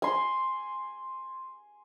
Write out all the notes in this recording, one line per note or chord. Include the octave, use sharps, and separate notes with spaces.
G#5 C6